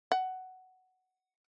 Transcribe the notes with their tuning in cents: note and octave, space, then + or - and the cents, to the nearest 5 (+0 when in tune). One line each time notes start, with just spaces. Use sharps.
F#5 +10